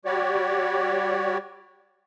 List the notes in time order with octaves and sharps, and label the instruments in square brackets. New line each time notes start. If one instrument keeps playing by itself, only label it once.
[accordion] G3 F#4 G4 C#5 D5